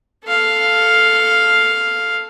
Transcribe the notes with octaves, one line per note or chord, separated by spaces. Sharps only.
A4 F5